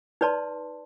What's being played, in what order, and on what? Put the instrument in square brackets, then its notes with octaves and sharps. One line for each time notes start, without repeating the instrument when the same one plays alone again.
[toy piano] D#4 B4 D5 A5 C6